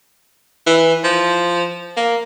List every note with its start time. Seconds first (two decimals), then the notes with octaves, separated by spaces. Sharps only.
0.67 E3
1.04 F3
1.97 A#3